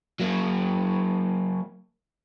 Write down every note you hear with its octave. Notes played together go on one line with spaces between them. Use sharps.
F#3 A#3